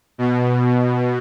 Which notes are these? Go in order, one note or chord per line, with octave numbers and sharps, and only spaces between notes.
B2